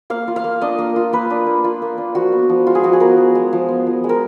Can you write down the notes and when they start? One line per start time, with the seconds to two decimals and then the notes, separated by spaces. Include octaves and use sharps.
0.10 A#3 F5
0.28 F4
0.36 F5
0.44 A#3
0.61 D4 D#5
0.78 A#3
0.96 F4
1.13 A#3 B4
1.30 D4
1.47 A#3
1.64 F4
1.82 A#3
1.98 D4
2.15 F3 F#4
2.32 B3
2.50 F3
2.67 G#3 F4
2.75 G#4
2.83 F3 F#4
2.93 G#4
3.00 B3 A#4
3.17 F3
3.35 G#3
3.53 F3
3.69 B3
3.87 F3
4.04 G#3
4.09 A#4